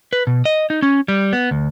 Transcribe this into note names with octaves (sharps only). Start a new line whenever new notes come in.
B4
B2
D#5
D#4
C#4
G3
B3
D2